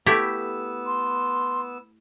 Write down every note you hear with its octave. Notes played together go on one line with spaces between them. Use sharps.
A3 B3 E4 G4 E6
C6